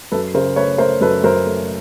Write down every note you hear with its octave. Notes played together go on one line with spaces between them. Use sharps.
F#2 A4 B4
C#3 A#4 C5
A3 B4 C#5
A3 A#4 C5
F#2 A4 B4
F#2 A#4 C5
A3